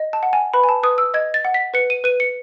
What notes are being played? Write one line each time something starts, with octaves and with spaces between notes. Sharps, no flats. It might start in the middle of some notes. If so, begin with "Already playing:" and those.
Already playing: D#5
A5
F#5
G#5
B4 B5
G#5
A5
B4 D#6
E6
D#5 G#6
A6
F#5
B6
B4 C#7
D#7
B4 D#7
C#7